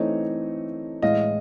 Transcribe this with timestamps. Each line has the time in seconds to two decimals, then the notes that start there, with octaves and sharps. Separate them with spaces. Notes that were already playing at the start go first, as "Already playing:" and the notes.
Already playing: E3 A3 C4 D#4 C#5 D#5
1.02 A2 E3 G#3 D#5 F5